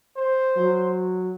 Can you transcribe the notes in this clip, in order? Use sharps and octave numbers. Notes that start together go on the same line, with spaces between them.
C5
F#3